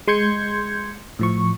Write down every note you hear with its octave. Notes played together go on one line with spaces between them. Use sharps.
G#3 C6 G6 G#6 C#7
A2 F3 C#6